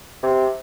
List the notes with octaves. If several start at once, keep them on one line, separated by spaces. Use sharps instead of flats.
C3